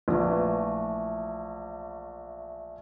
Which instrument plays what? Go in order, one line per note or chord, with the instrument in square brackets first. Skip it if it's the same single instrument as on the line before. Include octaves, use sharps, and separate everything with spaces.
[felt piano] A#1 [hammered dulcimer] E3 A3